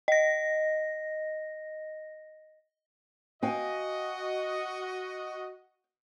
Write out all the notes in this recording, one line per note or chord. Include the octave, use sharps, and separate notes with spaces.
D#5 A#6
F#4 D#5 F5 G5 G#5